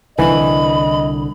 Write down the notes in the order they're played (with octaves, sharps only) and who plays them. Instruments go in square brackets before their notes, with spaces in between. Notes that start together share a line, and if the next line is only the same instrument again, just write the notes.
[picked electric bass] C2 D3 [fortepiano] E3 [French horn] D#5 [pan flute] B5